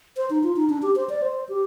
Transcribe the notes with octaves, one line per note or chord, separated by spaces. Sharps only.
C5
D#4
F4
D#4
D4
G4
C5
D5
C5
G4